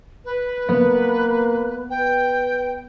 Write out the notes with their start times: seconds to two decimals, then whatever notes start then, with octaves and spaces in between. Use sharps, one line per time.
0.25 B4
0.69 A#3 B3
1.90 B4 G5